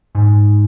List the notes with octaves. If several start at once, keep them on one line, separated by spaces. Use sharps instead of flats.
G#2